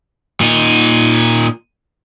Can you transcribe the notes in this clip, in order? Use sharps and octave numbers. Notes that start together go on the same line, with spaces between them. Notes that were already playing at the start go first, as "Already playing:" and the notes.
A#2 D#4